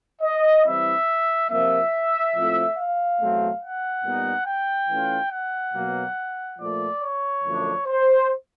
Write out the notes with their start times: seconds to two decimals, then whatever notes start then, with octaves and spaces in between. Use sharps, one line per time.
0.22 D#5
0.65 E3 G3 C4 E4 E5
1.49 C3 F3 A#3 E5
2.35 A2 F3 A3 C4 F4
2.77 F5
3.19 E2 B2 F#3 A3 C4
3.62 F#5
4.04 A#2 G3 B3 D#4
4.46 G5
4.89 E3 A3 C#4 F4
5.32 F#5
5.74 B2 F#3 A#3
6.59 A#2 F3 A3 D5
7.01 C#5
7.44 F#2 D3 F3 A3 D4
7.86 C5